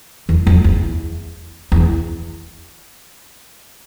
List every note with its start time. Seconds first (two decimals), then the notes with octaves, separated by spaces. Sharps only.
0.29 E2
0.47 F2
0.64 E2
1.72 E2